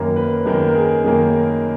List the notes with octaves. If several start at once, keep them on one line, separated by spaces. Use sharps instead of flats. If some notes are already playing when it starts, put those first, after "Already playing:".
Already playing: F#2 D#3 A#3 A#4
B4
F#2 D#3 A#3 A#4
A#4
G#4
F#2 D#3 A#3